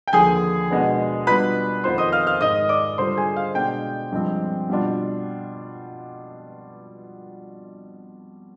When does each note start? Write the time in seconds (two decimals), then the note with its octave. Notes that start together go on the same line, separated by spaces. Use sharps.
0.08 G5
0.13 D#2 D3 F3 G#4 G#5
0.70 B2 G#3 B3 D4
1.27 B2 G3 D4 F4 B4 B5
1.84 F2 D#3 B3 F4 C5 C6
1.98 D#5 D#6
2.12 F5 F6
2.27 F5 F6
2.41 G#2 D#3 G#3 D#5 D#6
2.69 D5 D6
2.98 D3 G3 D4 F4 C5 C6
3.17 G#4 G#5
3.36 F5
3.55 B2 G#3 D4 G5
4.12 G2 F3 G#3 C4 F4
4.69 B2 G3 D4 F4